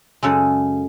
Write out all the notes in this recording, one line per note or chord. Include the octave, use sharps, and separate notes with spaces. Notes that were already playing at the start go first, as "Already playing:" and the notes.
F#2 C#3 G#3 A4